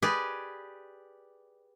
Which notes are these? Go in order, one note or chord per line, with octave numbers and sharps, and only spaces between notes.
G4 G#4 B4 D5